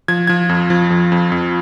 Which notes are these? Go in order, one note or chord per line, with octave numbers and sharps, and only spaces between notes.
F3 G#6
F3 G#6
F2
F3
F2
F2
F2